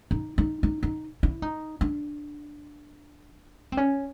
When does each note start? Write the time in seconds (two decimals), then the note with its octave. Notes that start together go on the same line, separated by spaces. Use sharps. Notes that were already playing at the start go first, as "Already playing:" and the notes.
0.11 D#4
0.38 D#4
0.63 D#4
0.83 D#4
1.23 E4
1.42 D#4
1.81 D4
3.72 C4
3.77 C#4